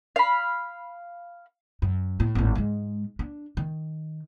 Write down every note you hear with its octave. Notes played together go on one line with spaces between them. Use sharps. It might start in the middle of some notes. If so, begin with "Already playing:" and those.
F5 B5
F#2
A2
G#1 A2
G#2 G#3
D4
D#3